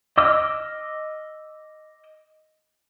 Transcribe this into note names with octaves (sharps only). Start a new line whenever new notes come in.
D#5 D6 E6 F6